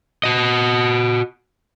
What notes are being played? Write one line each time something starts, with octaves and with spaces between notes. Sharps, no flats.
F#4 D#5